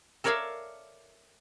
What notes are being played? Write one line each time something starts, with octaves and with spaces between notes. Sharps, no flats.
A4 A#4 C#5 D5 E5 F5